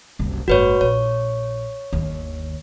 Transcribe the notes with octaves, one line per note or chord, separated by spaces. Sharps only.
F#1 C2
F#1 G#2 F#4 B4 C#5
A#1 C#5
G1 D#2